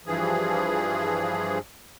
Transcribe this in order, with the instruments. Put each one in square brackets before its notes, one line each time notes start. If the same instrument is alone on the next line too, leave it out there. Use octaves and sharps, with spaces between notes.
[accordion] G2 E3 F3 G#4